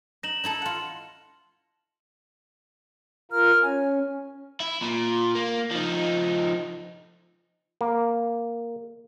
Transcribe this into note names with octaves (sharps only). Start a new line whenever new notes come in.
D#4 A#6 E7 F#7
D#4 E4 A4
F4 F#5
F4 A#4 F6
C#4 G#5
E4
A#2
A#3
F3 D#4
A#3